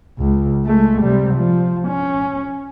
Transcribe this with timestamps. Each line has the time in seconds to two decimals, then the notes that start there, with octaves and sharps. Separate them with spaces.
0.19 C#2
0.65 G#3 A3
1.02 C3 G3
1.35 F3
1.88 C#4